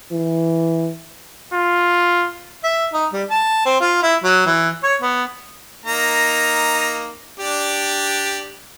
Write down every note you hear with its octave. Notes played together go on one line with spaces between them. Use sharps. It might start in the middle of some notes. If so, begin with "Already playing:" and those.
E3
F4
E5
D#4
G3
A5
C4
F4
E4
F#3
E3
C#5
B3
A#3 D#4 A#5
D4 G4 D5